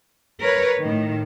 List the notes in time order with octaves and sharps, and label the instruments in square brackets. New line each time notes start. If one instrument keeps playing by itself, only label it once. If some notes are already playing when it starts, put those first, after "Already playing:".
[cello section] A#4 B4 C#5
A2 D#3